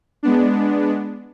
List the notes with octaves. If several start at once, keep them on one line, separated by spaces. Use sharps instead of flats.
G#3 B3 D4